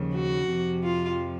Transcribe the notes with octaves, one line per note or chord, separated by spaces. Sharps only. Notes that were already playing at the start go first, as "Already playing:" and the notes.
Already playing: D#2 C#3 F3
F#4
F2 C3 F3
F4